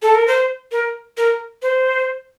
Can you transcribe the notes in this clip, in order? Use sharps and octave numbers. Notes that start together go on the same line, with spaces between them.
A4
A#4
C5
A#4
A#4
C5